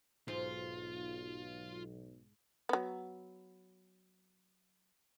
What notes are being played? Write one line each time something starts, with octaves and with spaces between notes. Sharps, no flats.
B1 G#2 F4
F#3 B3